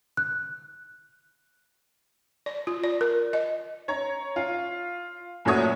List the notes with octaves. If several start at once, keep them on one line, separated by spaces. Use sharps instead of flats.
F#6
D5
F4
D5
A#4
D#5
C#5 A#5
F4
F#1 A#2 A3 F#4 C#5 D#6